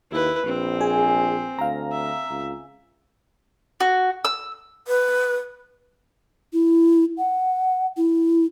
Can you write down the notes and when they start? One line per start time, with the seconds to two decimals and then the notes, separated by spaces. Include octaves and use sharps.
0.11 D#2 E4 B4
0.46 A#1 C4
0.81 G#4 G#5
1.59 D2 F5 A#5
1.91 E5
2.30 C#2
3.80 F#4
4.25 E6
4.88 B4
6.53 E4
7.18 F#5
7.97 E4